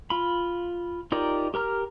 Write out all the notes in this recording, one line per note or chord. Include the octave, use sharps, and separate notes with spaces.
F4 B5
D#4 F4 G4 A#4 D5
G4 A#4 A#5 F6